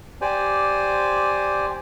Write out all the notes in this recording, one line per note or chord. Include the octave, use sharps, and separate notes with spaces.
G4 C5 D5 G#5